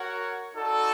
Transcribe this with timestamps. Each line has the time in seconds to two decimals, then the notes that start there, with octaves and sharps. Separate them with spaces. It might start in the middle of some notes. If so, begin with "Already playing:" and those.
Already playing: F#4 A#4 C#5 F#5
0.53 D#4 F#4 A4 D5